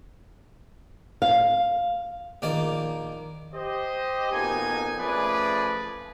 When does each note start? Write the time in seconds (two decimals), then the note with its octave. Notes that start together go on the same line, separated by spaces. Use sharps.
1.22 F5
2.42 A#1 D#3 A#3 A#4 D5
3.54 G4 C5 D#5
4.32 F2 B2 A#3 D#4 G#5
4.98 F3 A3 C#4 G#4 B4 D5